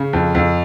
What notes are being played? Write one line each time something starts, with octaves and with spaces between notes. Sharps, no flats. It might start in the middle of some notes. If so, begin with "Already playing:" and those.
Already playing: C#3
F2
F2